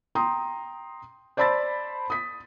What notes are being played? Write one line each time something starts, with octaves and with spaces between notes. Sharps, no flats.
G5 A#5 C6 D#6
C5 D5 A5 B5 E6 A6
D#6 B6